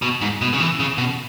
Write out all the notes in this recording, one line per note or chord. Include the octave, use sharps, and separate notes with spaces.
B2
G#2
B2
C#3
E3
C#3
B2